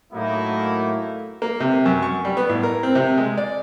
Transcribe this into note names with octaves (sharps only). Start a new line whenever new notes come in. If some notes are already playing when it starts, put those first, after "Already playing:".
A2 F#3 A3 A#3 D#4 E4
A#3
C3
F#2
C#6
G3
B3
A2
A#4
C4
C3
G#3
D5